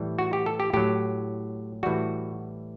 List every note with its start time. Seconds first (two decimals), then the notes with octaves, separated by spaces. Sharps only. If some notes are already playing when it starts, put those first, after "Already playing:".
Already playing: A2 E3 G3
0.19 F#4
0.33 G4
0.46 A4
0.60 G4
0.73 A2 F#3 G4
1.83 A2 E3 G3 F#4